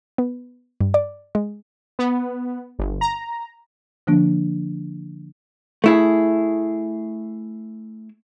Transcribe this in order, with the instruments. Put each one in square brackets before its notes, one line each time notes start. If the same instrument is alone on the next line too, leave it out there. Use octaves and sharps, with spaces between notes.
[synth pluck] B3
G2
D5
G#3
[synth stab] B3
G1
A#5
[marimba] D3 F3 A#3 D4
[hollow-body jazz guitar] A3 E4 G#4